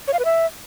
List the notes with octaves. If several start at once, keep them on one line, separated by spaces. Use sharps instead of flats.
C#5
F5
B4
E5